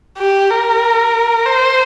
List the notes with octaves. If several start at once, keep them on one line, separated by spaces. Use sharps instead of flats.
G4
A#4
C5